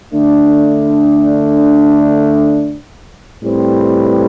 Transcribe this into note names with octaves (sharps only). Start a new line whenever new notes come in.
D3 A3 D4
A2 G3 C4 G4 B4